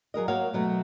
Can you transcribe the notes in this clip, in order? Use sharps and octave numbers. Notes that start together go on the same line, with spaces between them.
F#3 G#4 A#4 D#5
A#3 F#4 C#5 F5
B2 F#3 A3